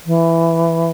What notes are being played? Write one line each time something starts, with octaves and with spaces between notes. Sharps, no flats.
E3